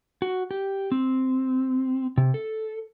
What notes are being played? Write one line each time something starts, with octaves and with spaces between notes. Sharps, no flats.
F#4
G4
C4
C3
A4